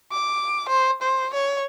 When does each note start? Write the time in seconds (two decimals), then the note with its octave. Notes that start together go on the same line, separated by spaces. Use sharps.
0.12 D6
0.69 C5
1.02 C5
1.34 C#5